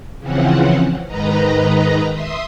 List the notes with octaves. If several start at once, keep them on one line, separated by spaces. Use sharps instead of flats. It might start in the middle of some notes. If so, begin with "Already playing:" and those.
C#3 E3 F3 C4 C#4 F#5
G#2 D#3 B4 D#5 A#5
E5 C6 D#6